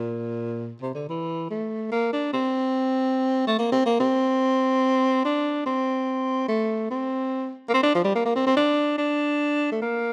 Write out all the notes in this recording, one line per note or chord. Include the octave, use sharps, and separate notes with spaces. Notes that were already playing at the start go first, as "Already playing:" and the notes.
Already playing: A#2
C3
D3
E3
A3
A#3
D4
C4
A3
A#3
C4
A#3
C4
D4
C4
A3
C4
A#3
C4
D4
F3
G3
A#3
A#3
C4
C4
D4
D4
A3
A#3